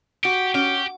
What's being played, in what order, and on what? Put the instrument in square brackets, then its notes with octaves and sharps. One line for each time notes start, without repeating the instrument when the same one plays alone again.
[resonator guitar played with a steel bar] F#4 [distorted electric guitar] G4
[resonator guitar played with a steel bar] C#4 [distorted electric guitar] G4